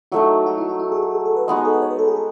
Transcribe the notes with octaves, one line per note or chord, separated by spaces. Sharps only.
F#3 A3 D#4 E4
F#4
E4
F#4
E4
G#4
G#4
G#4
A4
B4
G#3 B3 D#4 F#4 D#5
B4
A4
B4
C#5
B4
A4
G#4
A4